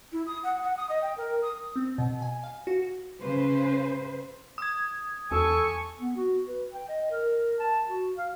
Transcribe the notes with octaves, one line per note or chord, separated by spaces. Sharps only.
E4
D#6
F#5
F#5
D#6
D#5
G5
A#4
D#6
C4
B2
G#5
F5
F#4
C#3 B4 C5
D#6 G#6
E2 A4 G#5 C#6
B3
F#4
B4
G5
D#5
A#4
A5
F#4
F5